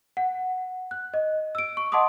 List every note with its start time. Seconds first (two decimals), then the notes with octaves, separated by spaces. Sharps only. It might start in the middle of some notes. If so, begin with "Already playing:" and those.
0.17 F#5
0.91 F#6
1.14 D#5
1.55 E6 D7
1.77 C#6
1.92 D#5 F#5 A5 C6 D6 D#6